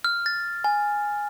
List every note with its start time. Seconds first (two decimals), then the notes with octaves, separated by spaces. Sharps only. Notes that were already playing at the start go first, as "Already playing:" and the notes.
0.04 F6
0.26 A6
0.64 G#5